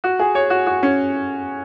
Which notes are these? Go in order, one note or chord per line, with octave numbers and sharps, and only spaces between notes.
F#4
G#4
C#5
F#4
F#4
C#4